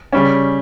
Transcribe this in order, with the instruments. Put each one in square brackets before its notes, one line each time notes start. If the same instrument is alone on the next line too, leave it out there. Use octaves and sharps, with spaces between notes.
[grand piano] C#3 G3 C#4